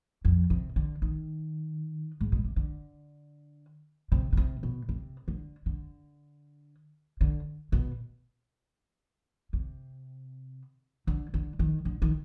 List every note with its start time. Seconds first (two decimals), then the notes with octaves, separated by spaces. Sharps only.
0.25 F2
0.50 C3
0.76 D3
1.02 D#3
2.21 G#2
2.32 B2
2.45 C3
2.56 D3
4.12 C3
4.32 D3
4.37 C3
4.63 B2
4.89 C3
5.28 D3
5.66 D3
7.21 D3
7.72 B2
9.53 C3
11.07 D3
11.34 D3
11.59 D#3
11.85 D3
12.02 D#3